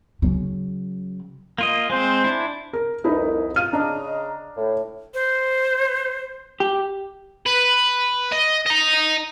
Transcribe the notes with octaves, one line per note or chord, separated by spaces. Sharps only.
C#3 F#3
A#3 F4 D#5
G#3 C4 C5
D4 E4
A#4
C2 F2 D#4 E4 B4
F4 F6 D#7
C#3 D4 D#5 A#5
A2
C5
G4
B4
D#5
D#5 A#5